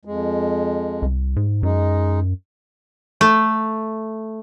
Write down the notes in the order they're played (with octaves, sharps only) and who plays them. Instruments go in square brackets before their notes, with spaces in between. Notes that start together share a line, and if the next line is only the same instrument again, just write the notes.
[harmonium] F2 G#3
[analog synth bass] C2
G#2
[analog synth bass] F#2 [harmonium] G#3 D#4
[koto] A3